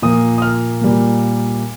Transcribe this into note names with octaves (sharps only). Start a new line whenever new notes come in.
A#2 F3 A#3 D#6
D#6
F6
A#2 G3 A#3